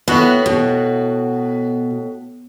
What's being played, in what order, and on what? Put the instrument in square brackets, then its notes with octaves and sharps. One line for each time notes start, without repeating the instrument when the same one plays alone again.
[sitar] A2 F#4 [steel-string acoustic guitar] B3
[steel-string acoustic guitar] B2